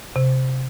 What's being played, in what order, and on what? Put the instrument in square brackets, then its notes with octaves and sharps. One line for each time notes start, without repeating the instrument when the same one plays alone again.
[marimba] C3